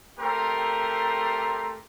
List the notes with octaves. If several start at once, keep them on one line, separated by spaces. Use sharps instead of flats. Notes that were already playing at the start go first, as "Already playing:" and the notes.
A3 C4 G4 A#4 A#5 C6